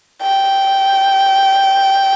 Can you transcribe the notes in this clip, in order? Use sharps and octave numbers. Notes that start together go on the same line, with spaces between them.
G5